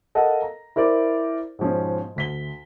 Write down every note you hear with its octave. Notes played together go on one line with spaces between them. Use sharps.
A4 A#4 D#5 F5 F#5
A#5
E4 A#4 C5 D5
G#2 B2 F3 C#4
D2 B6 G7